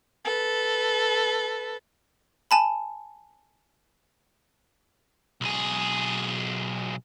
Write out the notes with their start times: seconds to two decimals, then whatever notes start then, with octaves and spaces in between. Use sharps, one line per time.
0.24 A4 B4
2.51 G#5 A5 B5
5.41 B1 G#4